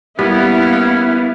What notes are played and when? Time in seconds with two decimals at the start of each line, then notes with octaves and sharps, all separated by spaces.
0.19 G3 A#3 B3 C#4 E4 F5